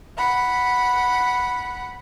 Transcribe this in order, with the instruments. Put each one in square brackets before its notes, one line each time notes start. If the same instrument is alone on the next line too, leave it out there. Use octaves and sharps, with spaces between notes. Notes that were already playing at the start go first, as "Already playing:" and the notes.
[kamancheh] F#5 B5